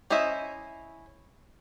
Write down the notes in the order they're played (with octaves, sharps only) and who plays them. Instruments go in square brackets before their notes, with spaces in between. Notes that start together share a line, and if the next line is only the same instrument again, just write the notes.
[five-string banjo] C#4 E4 C5 D#5 E5